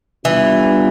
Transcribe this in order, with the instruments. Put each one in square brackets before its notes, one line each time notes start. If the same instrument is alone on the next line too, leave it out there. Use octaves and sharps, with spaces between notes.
[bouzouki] E3 [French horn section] G3 B3 D4 F4